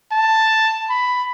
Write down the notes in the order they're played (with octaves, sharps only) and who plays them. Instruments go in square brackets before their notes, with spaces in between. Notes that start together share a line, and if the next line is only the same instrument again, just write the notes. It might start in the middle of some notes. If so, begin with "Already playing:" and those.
[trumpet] A5
B5